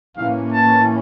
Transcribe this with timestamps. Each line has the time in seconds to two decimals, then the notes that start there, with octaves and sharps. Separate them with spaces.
0.16 A2 E3 A#3 C#4 F5
0.52 A5